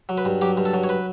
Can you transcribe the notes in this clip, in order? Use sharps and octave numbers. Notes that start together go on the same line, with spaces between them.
F#3
B4
G2
F#3 G4
G2
A4
F#3
C#5
B4